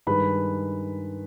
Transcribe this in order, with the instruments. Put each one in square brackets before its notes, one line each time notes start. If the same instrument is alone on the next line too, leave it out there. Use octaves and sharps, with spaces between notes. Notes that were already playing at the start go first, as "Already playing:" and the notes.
[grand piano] G2 D#3 G#3 B4 B5